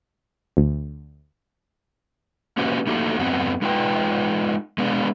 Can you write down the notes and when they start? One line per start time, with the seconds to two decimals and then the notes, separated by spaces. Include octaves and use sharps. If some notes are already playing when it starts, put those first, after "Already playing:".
0.57 D2
2.57 A#3 C#4 F#4 G4 B4 C5
2.87 A3 A#3 D#4 F#4 G4 A4
3.19 F#2 B3 C4 F#4
3.62 G#3 D#4 F4 B4 G5
4.78 G#3 B3 D4